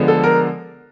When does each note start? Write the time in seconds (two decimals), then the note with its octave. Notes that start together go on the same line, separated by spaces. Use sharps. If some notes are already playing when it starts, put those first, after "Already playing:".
Already playing: D3 F3 G#3 B3
0.08 A4
0.24 A#4